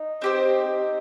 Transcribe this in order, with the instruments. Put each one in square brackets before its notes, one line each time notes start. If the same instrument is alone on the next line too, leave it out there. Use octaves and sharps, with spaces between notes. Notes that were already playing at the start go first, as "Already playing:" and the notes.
Already playing: [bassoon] D#4
[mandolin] C4 G4 C5